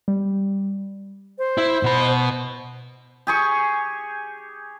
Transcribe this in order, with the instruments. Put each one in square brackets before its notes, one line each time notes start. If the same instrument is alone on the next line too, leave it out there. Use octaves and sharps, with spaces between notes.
[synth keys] G3
[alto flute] C5
[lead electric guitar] E4
B2 B5
[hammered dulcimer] G4 G#4 C#6